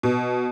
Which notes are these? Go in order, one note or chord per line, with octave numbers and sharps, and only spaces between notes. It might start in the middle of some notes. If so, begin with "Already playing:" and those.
B2